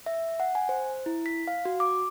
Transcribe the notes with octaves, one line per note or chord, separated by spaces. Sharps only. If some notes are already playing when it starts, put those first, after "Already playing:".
E5
F#5
G#5
C5
E4
B6
F5
F#4
D6